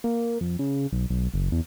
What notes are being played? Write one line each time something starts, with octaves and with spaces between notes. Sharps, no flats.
A#3
F2
C#3
B1
B1
F#1
E2